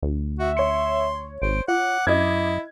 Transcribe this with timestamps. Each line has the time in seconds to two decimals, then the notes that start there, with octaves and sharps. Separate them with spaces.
0.03 D2
0.39 F#4 E5
0.57 C#5 C6 C#7
1.42 G#1 C5 D7
1.68 F4 F#5 D6
2.07 F#2 E4 D#5 G#6